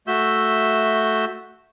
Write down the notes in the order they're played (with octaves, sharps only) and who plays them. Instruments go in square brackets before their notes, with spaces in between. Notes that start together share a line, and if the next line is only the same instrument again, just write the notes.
[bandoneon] A3 F#4 E5 E6 G6